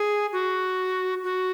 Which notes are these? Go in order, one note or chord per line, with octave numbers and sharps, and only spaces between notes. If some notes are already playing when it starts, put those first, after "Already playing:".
Already playing: G#4
F#4
F#4